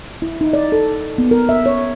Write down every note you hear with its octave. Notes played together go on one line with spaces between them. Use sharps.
E4
D#4
D5
A4
B3
A#4
E5
C#5